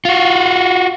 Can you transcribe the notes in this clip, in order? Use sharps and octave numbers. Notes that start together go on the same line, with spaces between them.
F4 F#4